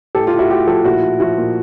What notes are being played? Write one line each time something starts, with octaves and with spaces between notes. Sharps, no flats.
A2 G4 A4
F4 G4
A2
E4 F#4
A2 F4 G4
F3 G4 A4
A#2 E4 F#4
F3
F3 E4 F#4
A#2